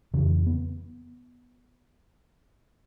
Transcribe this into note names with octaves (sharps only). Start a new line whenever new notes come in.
F2 C#3 E3
B3